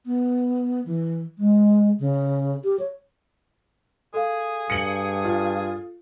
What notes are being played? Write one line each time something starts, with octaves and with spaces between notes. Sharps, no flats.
B3
E3
G#3
C#3
G4
C#5
G#4 A4 F5
G2 C#7 F#7
F4